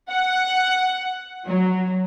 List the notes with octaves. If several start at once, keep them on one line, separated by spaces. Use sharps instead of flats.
F#5
F#3